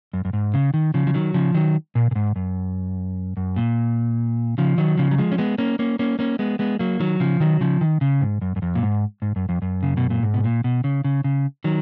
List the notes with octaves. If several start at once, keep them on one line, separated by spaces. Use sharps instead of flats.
F#2
F#2
G#2
C#3
D#3
C#3 F3
F3
D#3 F#3
C#3 F3
D#3 F#3
A#2
A#2
G#2
F#2
F#2
A#2
C#3 F3
D#3 F#3
C#3 F3
F#3
F3 G#3
C#4
G#3 B3
A#3 C#4
A#3 C#4
A#3 C#4
A#3 C#4
G#3 B3
G#3 B3
F#3 A#3
D#3 F#3
C#3 F3
D#3 F#3
C#3 F3
D#3
C#3
G#2
F#2
F#2
F2
A#2
G#2
G#2
F#2
F2
F#2
C#3
B2
A#2
G#2
B2
A#2
B2
C#3
C#3
C#3
D#3 F#3